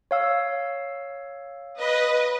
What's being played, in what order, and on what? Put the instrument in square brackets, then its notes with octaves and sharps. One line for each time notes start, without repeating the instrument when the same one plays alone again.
[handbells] C#5 F5 E6
[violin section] B4 D#5